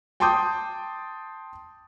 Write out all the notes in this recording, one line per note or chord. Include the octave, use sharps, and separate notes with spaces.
G5 A5 C6 D6 D#6 G6